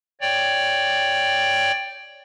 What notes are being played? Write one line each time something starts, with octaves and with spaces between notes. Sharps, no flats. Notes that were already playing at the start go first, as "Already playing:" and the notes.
C#5 D5 G5